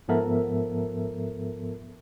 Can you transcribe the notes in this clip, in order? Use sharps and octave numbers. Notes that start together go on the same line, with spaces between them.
G#2 F3 B3 A4 A#4 E5